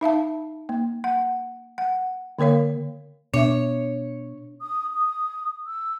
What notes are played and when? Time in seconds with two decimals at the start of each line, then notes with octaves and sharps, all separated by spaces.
0.01 D#4 E5 F5 A5
0.69 A#3
1.04 F#5
1.78 F#5
2.39 D3 A#3 A#4 C#5 F5
3.34 B2 D4 C#5 E5
4.61 D#6
4.93 D#6
5.66 E6